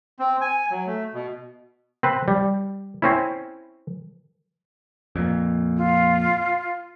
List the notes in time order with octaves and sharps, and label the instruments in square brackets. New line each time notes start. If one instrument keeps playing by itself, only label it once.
[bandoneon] C4
G#5
F#3
A3
B2
[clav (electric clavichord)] C4 B4
G3
C4 C#4 E4
[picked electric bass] F2 A#2
[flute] F4